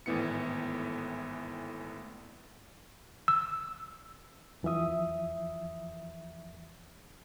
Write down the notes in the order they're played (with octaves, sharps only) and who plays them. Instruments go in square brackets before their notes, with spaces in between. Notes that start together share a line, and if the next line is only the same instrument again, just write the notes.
[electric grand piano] G#1 A2 E3 B3 E4 C#7
[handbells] E6
[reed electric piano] E2 E3 F3 E5 D#6